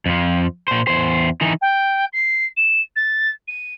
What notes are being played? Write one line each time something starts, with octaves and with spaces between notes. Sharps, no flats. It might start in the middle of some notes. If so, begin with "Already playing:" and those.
F2 F3
A#2 C5
E2 C5
E3 D#4
G5
C7
E7
A6
D#7